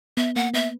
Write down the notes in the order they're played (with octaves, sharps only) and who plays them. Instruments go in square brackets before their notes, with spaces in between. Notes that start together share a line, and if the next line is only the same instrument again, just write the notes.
[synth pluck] B3 [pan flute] E5
[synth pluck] A#3 [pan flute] F#5
[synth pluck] B3 [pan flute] E5